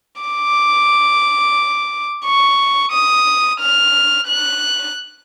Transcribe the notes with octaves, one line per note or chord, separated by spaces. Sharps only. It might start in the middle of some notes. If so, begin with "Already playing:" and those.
D6
C#6
D#6
F6
F#6